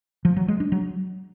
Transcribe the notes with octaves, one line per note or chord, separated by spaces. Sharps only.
F3
F#3
G#3
D4
F#3